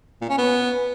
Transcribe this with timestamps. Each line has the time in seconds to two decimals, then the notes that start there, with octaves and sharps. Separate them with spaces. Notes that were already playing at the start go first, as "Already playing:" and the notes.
0.21 A#2
0.30 C#4
0.38 B3